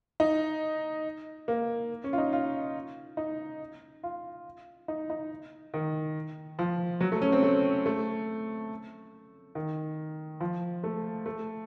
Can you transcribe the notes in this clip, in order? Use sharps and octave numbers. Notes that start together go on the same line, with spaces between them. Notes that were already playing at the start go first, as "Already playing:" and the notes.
D#4
A#3
C#4
F4
D#4
F4
D#4
F4
D#4
D#4
D#3
F3
F#3
A3
C#4
C4
A3
A3
D#3
F3
A3
A3